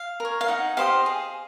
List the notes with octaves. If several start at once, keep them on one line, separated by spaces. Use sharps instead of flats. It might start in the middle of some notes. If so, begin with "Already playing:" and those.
Already playing: F5
A#4 C#5
F5
D#4 F#5
G4 C5 D#5 F5
G#4